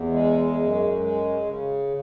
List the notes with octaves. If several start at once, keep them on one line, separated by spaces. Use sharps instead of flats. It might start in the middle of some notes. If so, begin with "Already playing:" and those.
Already playing: E2
G#3
F#2
G#3
C#3